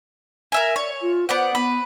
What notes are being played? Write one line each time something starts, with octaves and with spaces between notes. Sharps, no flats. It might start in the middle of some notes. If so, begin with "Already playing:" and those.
A#4 E5 G#5
C#5 D5
F4
B3 C5 D5 F#5
B3 B4